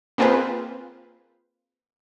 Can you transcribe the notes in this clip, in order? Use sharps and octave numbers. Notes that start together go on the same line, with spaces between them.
A#3 C4 F4 G#4 B4 C5